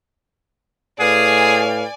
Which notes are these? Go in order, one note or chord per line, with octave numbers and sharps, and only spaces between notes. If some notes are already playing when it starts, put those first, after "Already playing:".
A2 G#4 B4 D5 F5 G#5